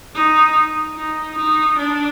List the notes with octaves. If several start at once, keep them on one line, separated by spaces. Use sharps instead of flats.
D#4
D#4
D#4
D4